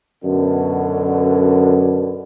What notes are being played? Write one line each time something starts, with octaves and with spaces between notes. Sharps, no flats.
F#2 B2 D3